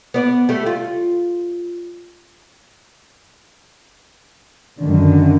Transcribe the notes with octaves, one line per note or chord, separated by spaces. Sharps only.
B3 D5
G3 A3
F4
F#2 D3 D#3